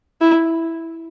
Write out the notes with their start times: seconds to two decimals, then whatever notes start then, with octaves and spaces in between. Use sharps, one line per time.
0.21 E4